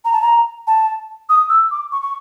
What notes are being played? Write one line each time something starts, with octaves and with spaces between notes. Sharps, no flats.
A#5
A5
A#5
A5
D#6
E6
D6
C#6
C#6